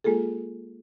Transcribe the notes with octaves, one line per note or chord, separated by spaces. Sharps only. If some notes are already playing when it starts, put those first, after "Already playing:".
G#3 A#3 F4 G#4 A4